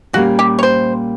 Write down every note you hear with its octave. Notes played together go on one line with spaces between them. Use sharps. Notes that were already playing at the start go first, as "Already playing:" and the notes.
A#2 G3 A#3 C#4 F#4
G4
C#5
C5